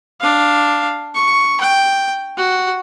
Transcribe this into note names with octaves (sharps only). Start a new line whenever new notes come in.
D4 F5
C#6
G5
F#4